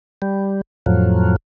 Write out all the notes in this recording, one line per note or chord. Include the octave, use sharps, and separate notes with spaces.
G3
F2 A2 F3 F#3